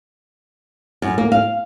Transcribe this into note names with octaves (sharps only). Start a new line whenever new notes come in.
F#2
A#3
F5